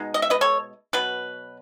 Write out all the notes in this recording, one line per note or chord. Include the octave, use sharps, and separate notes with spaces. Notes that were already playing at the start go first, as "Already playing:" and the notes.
Already playing: B2 G#3 D#4
D#5
E5
B4 D#5
A4 C#5
B2 F#3 B4